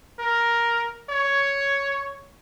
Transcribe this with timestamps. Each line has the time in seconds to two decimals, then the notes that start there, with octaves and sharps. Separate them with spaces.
0.19 A#4
1.09 C#5